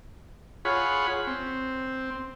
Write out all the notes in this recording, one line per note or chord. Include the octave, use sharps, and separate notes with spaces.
F4 G#4 C#5 F#5 B5
C4